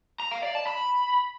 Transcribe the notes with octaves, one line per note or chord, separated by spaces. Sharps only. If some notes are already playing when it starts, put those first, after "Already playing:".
A#5
F5
D5
A5
B5